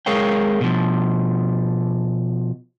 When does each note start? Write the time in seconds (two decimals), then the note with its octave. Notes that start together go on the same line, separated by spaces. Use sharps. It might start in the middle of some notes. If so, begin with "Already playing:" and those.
0.06 G#3 G#4 A#4 C#5 F5 G5
0.61 B2 F3